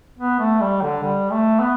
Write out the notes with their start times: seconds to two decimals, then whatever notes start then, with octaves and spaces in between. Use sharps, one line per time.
0.18 B3
0.40 A3
0.61 G3
0.82 D3
1.04 G3
1.32 A3
1.60 B3